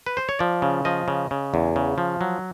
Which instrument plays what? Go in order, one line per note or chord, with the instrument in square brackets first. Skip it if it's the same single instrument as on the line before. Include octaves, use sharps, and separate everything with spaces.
[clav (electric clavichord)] B4
C5
C#5
F3 D5
C#3
F3 D#5
C#3
C#3
E2
C#3
F3
F#3